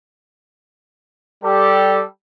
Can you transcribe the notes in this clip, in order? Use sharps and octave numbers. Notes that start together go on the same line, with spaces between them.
G3 G4 A4